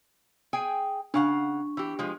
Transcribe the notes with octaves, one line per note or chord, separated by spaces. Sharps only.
G#4 G5 G#5
C#3 D4 F5 F#5 C#6
E3 G4
F3 G#3